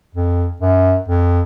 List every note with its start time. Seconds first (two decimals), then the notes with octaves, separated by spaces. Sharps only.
0.15 F2
0.61 F#2
1.08 F2